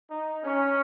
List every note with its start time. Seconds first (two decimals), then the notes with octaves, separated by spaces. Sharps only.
0.09 D#4
0.44 C#4